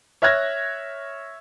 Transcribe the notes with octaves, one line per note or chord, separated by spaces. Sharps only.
C#5 E5 F6 F#6 G#6 A#6